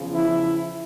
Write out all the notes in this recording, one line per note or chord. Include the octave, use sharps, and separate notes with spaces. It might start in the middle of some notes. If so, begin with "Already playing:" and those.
Already playing: E2 C#3 F3
E4